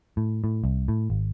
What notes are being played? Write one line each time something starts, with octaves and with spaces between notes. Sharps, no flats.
A2
A2
C2
A2
G#1